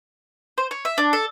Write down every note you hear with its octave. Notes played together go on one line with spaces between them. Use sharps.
C5
C#5
E5
D4
A4